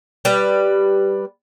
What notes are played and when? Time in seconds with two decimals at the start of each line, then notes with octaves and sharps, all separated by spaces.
0.25 G3 B4